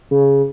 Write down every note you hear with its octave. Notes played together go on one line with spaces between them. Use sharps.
C#3